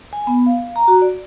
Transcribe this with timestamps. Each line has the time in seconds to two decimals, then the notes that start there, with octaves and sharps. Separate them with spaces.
0.13 G#5
0.27 B3
0.46 F5
0.76 A#5
0.88 F#4
1.02 D5